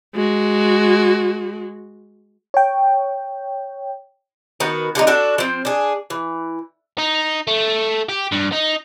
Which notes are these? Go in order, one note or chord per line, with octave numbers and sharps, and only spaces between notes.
G#3 F#4
C#5 G5
D#3 B3 F#4 B4
D3 G3 A3 D#4
D4 F#4 A4
F3 C4
D4 G#4
E3
D#4
A3
G4
G2
D#4